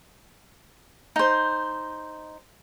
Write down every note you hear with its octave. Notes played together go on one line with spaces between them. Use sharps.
D#4 C5